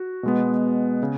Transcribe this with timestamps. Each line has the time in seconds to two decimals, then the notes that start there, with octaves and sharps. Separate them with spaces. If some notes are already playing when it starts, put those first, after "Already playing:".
Already playing: F#4
0.23 B2 G#3 B3
1.03 C#3